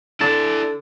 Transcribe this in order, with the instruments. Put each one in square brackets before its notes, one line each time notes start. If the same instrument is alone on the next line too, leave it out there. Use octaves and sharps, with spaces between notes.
[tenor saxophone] D3 [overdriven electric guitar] E4 D5 [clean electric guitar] A5